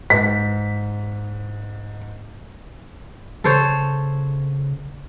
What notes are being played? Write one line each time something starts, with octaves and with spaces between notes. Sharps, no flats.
G#2 B6
C#3 A4 C5 C#5